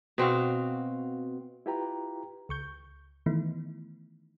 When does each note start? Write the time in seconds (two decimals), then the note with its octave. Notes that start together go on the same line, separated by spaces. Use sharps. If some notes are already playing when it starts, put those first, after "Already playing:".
0.18 B2 C4 F#4 F5
1.66 E4 F4 G4 B4 G5 A#5
2.49 C#2 C#6 G6
3.26 D#3 E3 A3 B3 D#4 E4